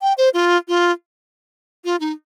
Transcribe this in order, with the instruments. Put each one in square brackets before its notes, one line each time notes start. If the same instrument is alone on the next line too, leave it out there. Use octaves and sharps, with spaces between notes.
[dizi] G5
C5
F4
F4
F4
D#4